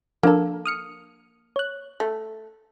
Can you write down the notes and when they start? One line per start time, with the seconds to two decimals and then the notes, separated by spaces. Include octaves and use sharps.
0.23 F3 A#3 D4 A4 A#4
0.65 D#6 F6 C#7
1.56 C#5 F#6
2.00 A3